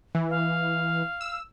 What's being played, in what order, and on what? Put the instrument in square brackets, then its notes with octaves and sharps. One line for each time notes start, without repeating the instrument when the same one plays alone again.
[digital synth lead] E3
[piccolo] F5
[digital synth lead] E6